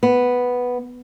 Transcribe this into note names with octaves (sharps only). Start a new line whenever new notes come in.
B3